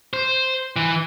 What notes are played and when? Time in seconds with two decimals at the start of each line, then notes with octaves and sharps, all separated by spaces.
0.13 C5
0.76 E3